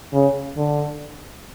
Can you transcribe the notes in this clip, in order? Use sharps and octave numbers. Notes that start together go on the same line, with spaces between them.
C#3
D3